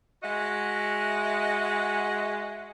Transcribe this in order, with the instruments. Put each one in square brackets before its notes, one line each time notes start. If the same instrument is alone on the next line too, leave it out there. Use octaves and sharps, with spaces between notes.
[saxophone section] G#3 F#4 D#5 E5 F#5